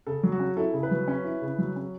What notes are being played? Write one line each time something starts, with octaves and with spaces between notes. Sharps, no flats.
C#3 A4
F#3
F#4
C#4
E4 A4
C#3
B4
F#3
C#4
E4
C#3
F#3
C#4